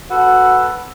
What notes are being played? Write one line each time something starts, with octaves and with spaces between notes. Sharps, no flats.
F#4 A4 B4